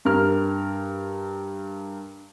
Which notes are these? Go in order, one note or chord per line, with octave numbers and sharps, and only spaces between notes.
G2 A#4 F6